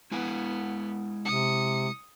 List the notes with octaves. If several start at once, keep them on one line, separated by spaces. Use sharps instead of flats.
G#3 B3 E4 G#5
C3 D#6 C#7